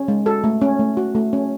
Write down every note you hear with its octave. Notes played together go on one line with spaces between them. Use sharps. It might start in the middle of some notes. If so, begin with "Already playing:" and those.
Already playing: C#4
G#3
F#4 A4
A3
C#4
A3
F#4
A3
C#4